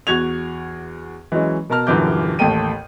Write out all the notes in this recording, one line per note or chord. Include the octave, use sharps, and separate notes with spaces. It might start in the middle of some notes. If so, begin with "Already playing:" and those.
E2 F#4 G#6 F7
E3 F#3 G#3 C#4
B2 A#4 A5 A#5 F6
D#1 F#2 D3 E3 D6 G6
A1 D#2 A4 G5 D#7